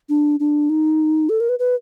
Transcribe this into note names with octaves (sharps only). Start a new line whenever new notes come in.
D4
D4
D#4
A4
A#4
B4
B4